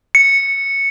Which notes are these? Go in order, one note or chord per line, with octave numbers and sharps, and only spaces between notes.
C#7